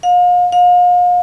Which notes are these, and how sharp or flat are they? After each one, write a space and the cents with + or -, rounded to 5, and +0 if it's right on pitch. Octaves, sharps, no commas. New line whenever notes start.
F5 +35
F5 +35